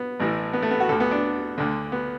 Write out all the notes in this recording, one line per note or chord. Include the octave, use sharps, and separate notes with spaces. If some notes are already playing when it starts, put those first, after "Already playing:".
Already playing: B3
A1 A2 E3
B3
A3
B3
F#4
D2 D3 A4
B3
D4
D2 D3
B3